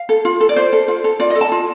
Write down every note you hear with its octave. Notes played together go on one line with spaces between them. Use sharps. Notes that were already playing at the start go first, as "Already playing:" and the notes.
Already playing: F5
A4
F4
A4
D5
F4 C5
A4
F4
A4
F4 D5
D#5
A4
A5
F4